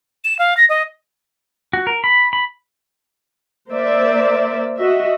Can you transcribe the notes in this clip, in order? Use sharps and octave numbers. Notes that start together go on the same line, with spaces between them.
E7
F5
A#6
D#5
F#4
A#4
B5
B5
A#3 A#4 C5 D5 E5
F#4 D#5 E5